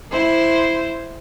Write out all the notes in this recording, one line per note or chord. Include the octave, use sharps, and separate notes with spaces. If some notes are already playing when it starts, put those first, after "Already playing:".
E4 C5